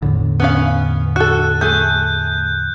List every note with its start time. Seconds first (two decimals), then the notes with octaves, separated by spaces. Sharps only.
0.02 E2 A2 D3
0.40 B3 C#4 F5
1.16 F#4 A4 F#6
1.61 A3 G#4 G6